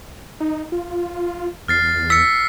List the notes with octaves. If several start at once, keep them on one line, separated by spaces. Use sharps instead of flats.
D#4
F4
E2 F6 A6 C7
E6 B6 C#7